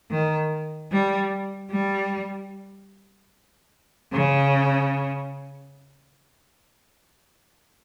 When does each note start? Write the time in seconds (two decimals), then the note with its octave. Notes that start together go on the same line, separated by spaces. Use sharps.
0.11 D#3
0.92 G3
1.71 G3
4.13 C#3